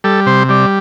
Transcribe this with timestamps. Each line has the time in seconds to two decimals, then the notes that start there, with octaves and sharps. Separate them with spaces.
0.04 G3 A4
0.26 C3 C5
0.49 G3 D5